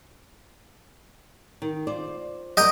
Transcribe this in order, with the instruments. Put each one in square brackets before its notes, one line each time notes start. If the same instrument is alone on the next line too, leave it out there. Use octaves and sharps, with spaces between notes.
[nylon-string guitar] D#3
F4 C5 D5
[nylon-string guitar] A#3 B4 D5 [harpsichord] D#5 G5 A#5